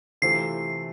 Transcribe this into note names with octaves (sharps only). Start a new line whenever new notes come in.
C3 E3 A3 C4 F4 C7